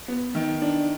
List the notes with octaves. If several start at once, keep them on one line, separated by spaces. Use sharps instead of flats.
B3
D#3
D4